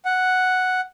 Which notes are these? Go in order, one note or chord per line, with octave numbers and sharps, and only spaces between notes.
F#5